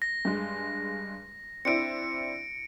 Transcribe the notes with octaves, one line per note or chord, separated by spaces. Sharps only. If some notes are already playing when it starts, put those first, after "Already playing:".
A#6
G2 G#3
C4 D4 E4 C#7 D7